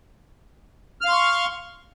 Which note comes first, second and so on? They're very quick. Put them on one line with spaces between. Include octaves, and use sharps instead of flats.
F6 F5 C6 C#6